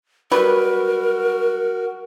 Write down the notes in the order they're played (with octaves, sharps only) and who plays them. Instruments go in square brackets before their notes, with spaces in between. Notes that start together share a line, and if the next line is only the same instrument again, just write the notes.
[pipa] F#3 G3 B4 [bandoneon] F#4 [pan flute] A#4